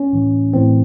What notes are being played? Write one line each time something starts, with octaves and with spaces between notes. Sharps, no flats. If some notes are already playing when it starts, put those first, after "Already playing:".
Already playing: C#4
A2 E3
A2 E3 C4